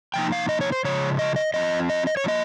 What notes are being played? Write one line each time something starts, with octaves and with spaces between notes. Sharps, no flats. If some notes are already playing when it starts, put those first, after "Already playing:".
C3 F3 A#3 D#4 G5
F5
D#5
C#5
C5
C#3 F3 G#3 C#5
D#5
D#5
F3 C4 F4 D#5
D#5
D#5
C#5
C#3 F3 A#3 D#5